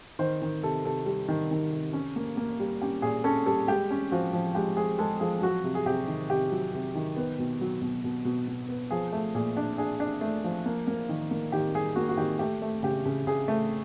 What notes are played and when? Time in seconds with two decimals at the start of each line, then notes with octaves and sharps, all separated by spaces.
0.19 D#3 C5
0.42 D#3
0.63 C3 A4
0.85 C3 A4
1.06 G3
1.28 D#3
1.51 D#3
1.72 C3
1.93 C#4
2.16 A#3
2.37 A#3
2.60 G3
2.82 C#4 G4
3.02 A#2 G#4
3.24 C#4 A4
3.46 G3 A4
3.68 G#3 G4
3.91 C#4
4.11 F3 F#4
4.33 F3
4.55 G#3 G4
4.77 G#3 G#4
4.99 G#3 A4
5.20 F3 G#4
5.42 F#3 F#4
5.64 C3
5.75 G#4
5.86 C3 G4
6.08 D#3
6.30 C3 G4
6.51 F#3
6.74 C3
6.95 D#3
7.17 B3
7.39 B2
7.61 F#3
7.82 B2
8.04 B2
8.25 B2
8.48 B2
8.69 B3
8.91 F3 G#4
9.13 A3
9.35 A#2 G#4
9.57 D4
9.78 D4 G#4
10.00 D4
10.21 A3
10.44 F3
10.66 A#3
10.87 A#3
11.09 D#3
11.31 A#3
11.52 D#3 G4
11.74 G3 G#4
11.96 A#3 F#4
12.09 F#4
12.17 D#3 G4
12.39 A3 G4
12.62 A3
12.83 C#3 G4
13.06 C#3
13.27 C#3 G#4
13.48 A3